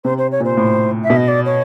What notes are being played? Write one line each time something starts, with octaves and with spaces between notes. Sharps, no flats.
C3 C5
C5
C#5
A#2 C5
A2
E5
B2
D#5
D5
C#5